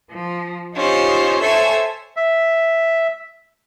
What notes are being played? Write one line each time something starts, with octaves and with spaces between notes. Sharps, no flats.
F3
C#4 D#4 F4 G4 C5
A4 C5 C#5 E5 G#5
E5